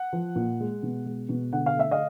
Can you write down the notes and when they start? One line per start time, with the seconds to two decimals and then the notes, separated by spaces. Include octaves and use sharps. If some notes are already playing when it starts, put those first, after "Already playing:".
Already playing: F#5
0.13 F3
0.36 A#2
0.60 G#3
0.83 B2
1.06 G#3
1.29 B2
1.52 D3 F#5
1.66 F5
1.76 A3 E5
1.91 D#5 F5